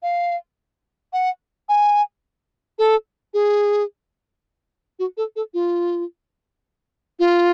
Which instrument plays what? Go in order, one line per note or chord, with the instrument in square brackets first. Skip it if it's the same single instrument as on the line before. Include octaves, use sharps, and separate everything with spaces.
[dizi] F5
F#5
G#5
A4
G#4
F#4
A4
A4
F4
F4